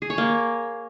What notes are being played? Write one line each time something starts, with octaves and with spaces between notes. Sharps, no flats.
G#4
C#5
A#3